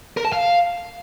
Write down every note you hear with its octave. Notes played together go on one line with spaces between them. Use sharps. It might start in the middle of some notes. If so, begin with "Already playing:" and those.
A#4
A5
F5